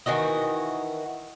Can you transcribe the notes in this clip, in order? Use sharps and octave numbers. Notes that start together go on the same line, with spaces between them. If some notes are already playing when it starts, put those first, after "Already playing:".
D#3 E3 F#4 D#5